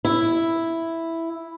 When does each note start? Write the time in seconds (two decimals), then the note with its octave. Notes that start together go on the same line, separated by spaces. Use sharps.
0.05 E4